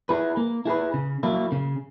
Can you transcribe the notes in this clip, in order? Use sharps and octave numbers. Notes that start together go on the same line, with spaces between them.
E4 G#4 B4
A#3
E4 G#4 B4
C#3
F#3 A#3 E4
C#3